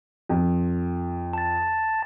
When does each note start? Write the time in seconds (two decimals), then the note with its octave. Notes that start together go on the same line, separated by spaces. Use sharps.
0.29 F2
1.33 A5 A6